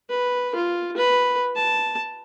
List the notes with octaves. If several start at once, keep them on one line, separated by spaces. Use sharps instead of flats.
B4
F4
B4
A5